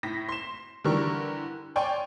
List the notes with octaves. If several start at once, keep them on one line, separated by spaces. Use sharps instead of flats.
A2 A#6 B6
C6 E7
D3 E3 G3 A#4 C#6
C#5 D5 G5 G#5 C6 C#6